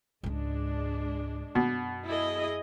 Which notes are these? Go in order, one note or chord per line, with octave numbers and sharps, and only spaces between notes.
C#2 G#2 G#3 D4
F#2 B2
E4 G#4 D#5